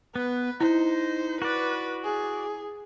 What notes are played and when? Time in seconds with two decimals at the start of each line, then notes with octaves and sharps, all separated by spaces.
0.16 B3 B4
0.61 D#4 E4 C5
1.42 F#4 B4 D5
2.04 G#4